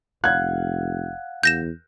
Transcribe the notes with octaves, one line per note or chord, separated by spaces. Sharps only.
F1 F5 F#5 F#6 G#6
E2 G6 A#6 E7